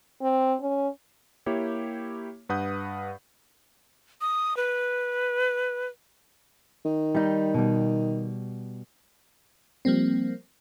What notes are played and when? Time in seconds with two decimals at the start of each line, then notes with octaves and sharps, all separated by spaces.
0.22 C4
0.61 C#4
1.46 A#3 E4 G4 C#5
2.49 G2 B4 F#5 D#6 G6
4.21 D#6
4.57 B4
6.85 D#3
7.15 G3 D#4
7.54 B2 G3
9.85 F3 G3 A#3 C4